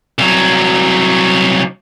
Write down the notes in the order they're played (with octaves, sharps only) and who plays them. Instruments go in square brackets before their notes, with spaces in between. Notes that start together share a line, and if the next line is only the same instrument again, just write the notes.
[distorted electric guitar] C2 F#3